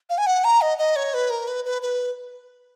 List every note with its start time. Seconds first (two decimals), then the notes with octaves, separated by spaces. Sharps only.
0.10 F5
0.18 G#5
0.26 F#5
0.44 A#5
0.61 D#5
0.78 D#5
0.96 C#5
1.14 B4
1.30 A#4
1.47 B4
1.65 B4
1.82 B4